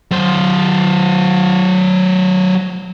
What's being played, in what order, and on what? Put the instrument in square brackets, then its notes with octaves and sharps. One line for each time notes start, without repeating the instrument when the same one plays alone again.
[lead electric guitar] F#3 C5